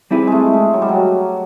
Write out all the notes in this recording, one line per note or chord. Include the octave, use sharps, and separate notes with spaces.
G3 C4 E4 G#4 B4
G#3 A3
G#3
F#3
G3
F#3